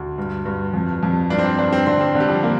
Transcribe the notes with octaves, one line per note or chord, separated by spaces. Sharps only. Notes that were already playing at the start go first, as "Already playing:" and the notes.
Already playing: D2
G2
G2
F2
F2
G2 D4
C4
D4
G2 D4
C4
D3 C4
C4
D3
G3
F3
A#3